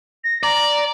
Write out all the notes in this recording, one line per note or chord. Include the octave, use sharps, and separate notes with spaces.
A#6
D5 A#5